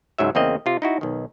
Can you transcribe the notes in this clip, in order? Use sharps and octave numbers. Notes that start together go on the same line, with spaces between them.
C#2 G#2 F#3 E5
E2 C#3 A#3 C4 D#5
C3 F4
D#4 E4 F#4
B1 D#3